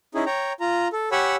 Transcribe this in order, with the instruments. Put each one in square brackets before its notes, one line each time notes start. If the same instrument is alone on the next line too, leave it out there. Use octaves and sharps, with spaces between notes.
[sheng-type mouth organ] C#4 D#4 E4 G#4
C#5 G5 A#5
F4 A#5
A4
G4 C#5 F#5 G#5 B5 E6